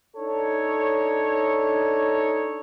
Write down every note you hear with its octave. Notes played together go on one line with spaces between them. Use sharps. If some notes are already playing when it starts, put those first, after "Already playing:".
D4 D#4 A4 C#5